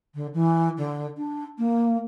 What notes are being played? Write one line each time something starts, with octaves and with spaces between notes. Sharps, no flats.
D3
E3
D3
D4
A#3